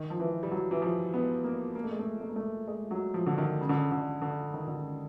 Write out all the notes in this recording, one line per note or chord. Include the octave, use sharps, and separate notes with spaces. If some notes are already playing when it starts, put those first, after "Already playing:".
Already playing: D#3
F3
E3
G3
F#3
E3
F3
B3
A#3
A#3
A3
G#3
A3
A3
A#3
A3
G#3
F#3
F3
D3
D#3
C#3
D3
C#3
D3
D3
D#3
D3
C#3